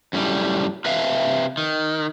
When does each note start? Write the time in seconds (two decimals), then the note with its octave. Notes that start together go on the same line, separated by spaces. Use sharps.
0.13 F#2 A2 G3
0.85 C3 B4 E5 F5
1.57 D#3